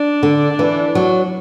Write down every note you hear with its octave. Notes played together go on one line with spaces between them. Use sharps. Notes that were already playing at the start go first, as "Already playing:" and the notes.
Already playing: D4
D3
E3
F#3